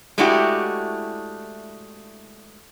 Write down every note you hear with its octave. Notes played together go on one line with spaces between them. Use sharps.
G#3 A3 D4 E4 F#4 G4